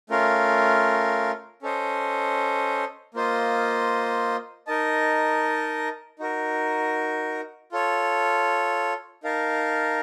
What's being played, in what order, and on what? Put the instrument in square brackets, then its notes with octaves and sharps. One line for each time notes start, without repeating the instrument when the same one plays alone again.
[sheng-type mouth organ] A3 C#4 F4 A#4 F5
C#4 A4 C5 D#5
A#3 F4 C5 D#5
D#4 A#4 D#5 A5
D#4 F#4 A#4
F4 A4 C#5
D#4 A#4 F5 A5